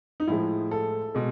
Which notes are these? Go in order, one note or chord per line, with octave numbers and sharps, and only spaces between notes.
D#4
A2 F3 G#3 E4
A4
B2 G#3